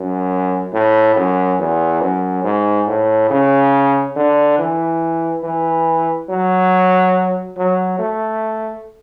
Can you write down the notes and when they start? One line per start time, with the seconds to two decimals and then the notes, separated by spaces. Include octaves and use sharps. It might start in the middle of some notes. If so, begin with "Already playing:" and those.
Already playing: F#2
0.73 A2
1.16 F#2
1.60 E2
2.01 F#2
2.44 G#2
2.88 A2
3.30 C#3
4.16 D3
4.58 E3
5.43 E3
6.29 F#3
7.57 F#3
7.99 A3